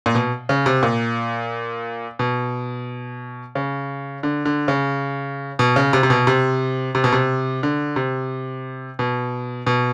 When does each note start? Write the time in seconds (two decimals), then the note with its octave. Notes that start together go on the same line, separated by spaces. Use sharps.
0.06 A#2
0.15 B2
0.49 C#3
0.66 C3
0.83 A#2
2.19 B2
3.55 C#3
4.23 D3
4.45 D3
4.68 C#3
5.59 B2
5.76 C#3
5.93 C3
6.03 C3
6.10 B2
6.27 C3
6.95 C3
7.04 B2
7.12 C3
7.63 D3
7.96 C3
8.99 B2
9.67 B2